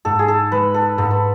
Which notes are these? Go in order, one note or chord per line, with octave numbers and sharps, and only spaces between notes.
G#2 A4
G#4
A4
G#3 B4
A4
G#2 A4
B4